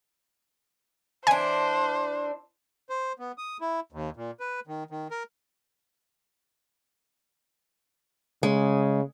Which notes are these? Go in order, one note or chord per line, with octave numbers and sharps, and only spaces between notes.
E3 D4 C5 G#5
C5
B3
D#6
E4
D#2
A#2
B4
D#3
D#3
A#4
C#3 G#3